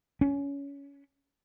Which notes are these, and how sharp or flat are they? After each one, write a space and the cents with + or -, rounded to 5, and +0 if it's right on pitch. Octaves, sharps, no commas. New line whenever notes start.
C#4 +20